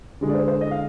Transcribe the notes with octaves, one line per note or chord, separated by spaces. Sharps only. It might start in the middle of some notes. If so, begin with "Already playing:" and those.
D3 G#3
D5
C5
C5
D#5
F5